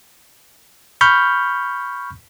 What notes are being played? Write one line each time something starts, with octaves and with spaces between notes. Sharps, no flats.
B5 C#6 F6 G6